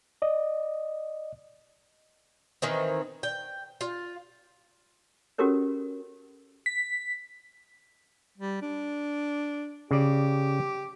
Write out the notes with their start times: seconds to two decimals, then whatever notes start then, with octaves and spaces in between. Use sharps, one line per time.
0.22 D5 D#5
2.62 D#3 E3 C4
3.23 G5
3.81 F4
5.38 C#4 F#4 G4 A4 A#4 C#5
6.66 B6
8.38 G3
8.62 D4
9.91 C#3 G4 D5